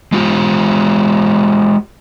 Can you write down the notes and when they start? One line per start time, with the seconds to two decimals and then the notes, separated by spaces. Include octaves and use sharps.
0.12 G#3 F4 G4